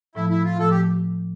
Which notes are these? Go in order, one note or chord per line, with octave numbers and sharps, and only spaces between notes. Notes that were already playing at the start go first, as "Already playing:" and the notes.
A2 F3 A3 E4
E4
F4
A2 F3 A3 A4
G4